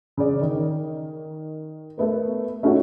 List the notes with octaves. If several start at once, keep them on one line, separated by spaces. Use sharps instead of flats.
C#3 D5
D#3
A3 B3 A#4
A3 C#4 D#4 F#4